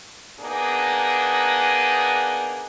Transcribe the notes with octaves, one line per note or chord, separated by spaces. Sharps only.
A#3 B3 D4 D#4 G#4